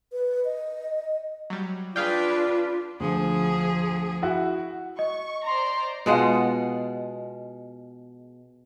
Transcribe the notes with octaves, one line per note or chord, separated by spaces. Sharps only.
B4
D#5
F#3 G3
D4 F4 G#4 B4 D5 F5 G5
D2 F3 G#4
E4 F#4
D#5 C#6
C5 D5 A#5 C6
B2 G#3 F4 F#5